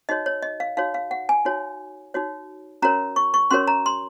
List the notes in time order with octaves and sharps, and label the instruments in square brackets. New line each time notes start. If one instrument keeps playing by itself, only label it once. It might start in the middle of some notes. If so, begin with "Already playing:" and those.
[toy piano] D#4 F#4 C#5 D#5
C#5
D#5
F5
D#4 F#4 C#5 F5
F5
F#5
G#5
D#4 F#4 C#5
D#4 F#4 C#5
C#4 F#4 A#4 C#5 A#5
C#6
C#6
C#4 F#4 A#4 C#5 C6
A#5
C6